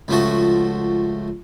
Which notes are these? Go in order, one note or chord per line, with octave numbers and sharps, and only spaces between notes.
C#2 F3 A3 F#4